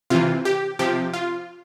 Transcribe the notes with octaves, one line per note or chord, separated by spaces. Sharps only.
C3 E3 F4
G4
C3 F3 G4
F4